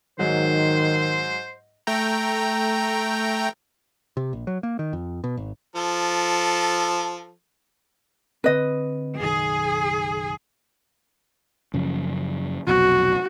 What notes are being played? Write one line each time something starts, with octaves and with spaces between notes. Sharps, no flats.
G#2 D#3 F#3 C5
A3 G5 A#5
C3
A#1
F#3
A#3
D#3
F2
B2
G#1
F3 A4
D3 C4 B4 D#5
F#1 B1 D#3 G#4
F#2 C#3 F3
F1 B1 F#4